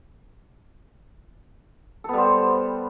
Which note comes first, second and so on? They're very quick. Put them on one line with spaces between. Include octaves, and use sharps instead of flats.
A4 B3 G3 C5